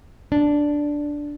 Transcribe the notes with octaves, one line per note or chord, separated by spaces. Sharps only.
D4